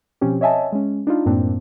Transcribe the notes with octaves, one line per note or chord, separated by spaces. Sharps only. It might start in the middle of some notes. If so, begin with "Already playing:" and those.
B2 F3 C4 C#4 G4
C#5 D#5 E5 G#5 A5
G#3 C#4
D4 D#4 F4
F#2 A2 A#3 C4 D4